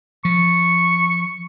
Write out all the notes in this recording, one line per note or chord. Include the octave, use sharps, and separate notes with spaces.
F3 C#6